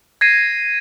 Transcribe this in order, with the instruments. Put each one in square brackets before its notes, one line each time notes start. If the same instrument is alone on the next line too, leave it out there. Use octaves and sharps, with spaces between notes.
[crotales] G#6 A#6 C7 D#7